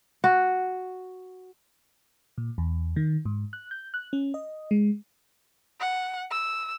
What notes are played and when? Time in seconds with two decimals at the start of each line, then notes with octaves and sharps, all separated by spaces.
0.24 F#4
2.38 A#2
2.58 E2
2.96 D#3
3.25 G#2
3.53 F#6
3.71 G6
3.94 F#6
4.13 C#4
4.34 D#5
4.71 G#3
5.80 F#5
6.31 E6